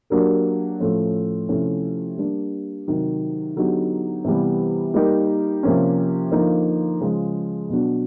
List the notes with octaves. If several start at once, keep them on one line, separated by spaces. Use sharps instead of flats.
F#3 A#3 D4 G4 A#4
A2 F3 A3 C#4
C3 F3 A3 C#4 E4
G3 A#3 D4
C3 D#3 F#3
D3 F#3 B3 D#4 G4
C3 E3 G3 B3
G3 A#3 D#4 G4 A#4
C3 F3 A#3 C#4
D3 F3 A#3 D#4
C#3 F3 G#3
B2 F#3 B3 D4 F#4